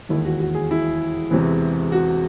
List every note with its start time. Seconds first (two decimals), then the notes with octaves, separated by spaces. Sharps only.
0.09 E1 D#2 D#3 E4
0.25 F#4
0.40 F#4
0.55 G#4
0.71 E4
1.31 E1 E2 C3 E3
1.92 F#4